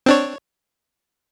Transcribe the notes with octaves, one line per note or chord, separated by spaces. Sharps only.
C4 D4 C#5